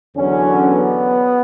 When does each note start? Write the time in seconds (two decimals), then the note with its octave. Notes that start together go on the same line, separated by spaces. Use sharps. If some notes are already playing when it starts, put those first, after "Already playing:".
0.15 E2 D3 F#3 C#4
0.65 B3